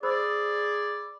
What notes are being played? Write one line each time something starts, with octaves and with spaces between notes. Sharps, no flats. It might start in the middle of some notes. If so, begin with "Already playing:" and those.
G#4 C5 D5 B5 E6